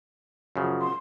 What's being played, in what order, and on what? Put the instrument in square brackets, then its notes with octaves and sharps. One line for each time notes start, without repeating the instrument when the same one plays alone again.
[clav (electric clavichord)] F#2 C#3 F3
[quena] C6